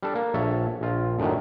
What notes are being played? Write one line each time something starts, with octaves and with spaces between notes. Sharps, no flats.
G3 D4 A4
A#3
A#1 A4 C#5 E5
A#1 F4
F#2 A2 D3 D#3